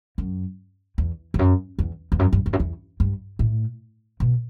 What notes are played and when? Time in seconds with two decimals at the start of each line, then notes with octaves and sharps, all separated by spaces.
0.18 F#2
0.98 E2
1.34 E2
1.39 F#2
1.79 E2
2.12 E2
2.19 F#2
2.33 G2
2.46 E2
2.53 F#2
2.60 E2
3.00 G2
3.39 A2
4.20 B2